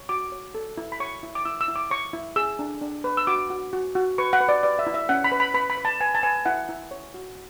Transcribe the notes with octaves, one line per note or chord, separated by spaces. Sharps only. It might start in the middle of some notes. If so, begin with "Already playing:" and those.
Already playing: C#5
F#4 D6
C#5
A4
E4
B5
C#5 C#6
E4
D6
E4 E6
E6
E4
D6
C#5 C#6
E4
G#4 E6
D4
D4
B4
E6
F#4 D6
F#4
F#4
F#4
B4 C#6
F#5
B4
D5
B4 D5
E5
E4
E5
C#4 F#5
B5
B4
B5
B4 B5
B5
B4
A5
B4 G#5
A5
B4 G#5
E4 F#5
E4
C#5
F#4